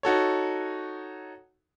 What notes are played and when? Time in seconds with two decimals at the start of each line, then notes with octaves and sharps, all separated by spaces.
0.03 D#4 F#4 A4 C#5